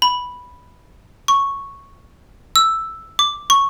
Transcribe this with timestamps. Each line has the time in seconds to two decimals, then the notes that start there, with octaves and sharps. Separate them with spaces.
0.02 B5
1.28 C#6
2.56 E6
3.19 D6
3.50 C#6